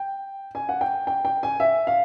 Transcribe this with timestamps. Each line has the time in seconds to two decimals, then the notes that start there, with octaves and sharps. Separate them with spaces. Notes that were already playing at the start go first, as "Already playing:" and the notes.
Already playing: G5
0.55 G#5
0.69 F#5
0.81 G5
1.07 G5
1.25 G5
1.43 G#5
1.60 E5
1.87 F5